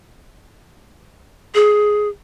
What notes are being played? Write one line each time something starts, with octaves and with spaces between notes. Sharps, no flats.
G#4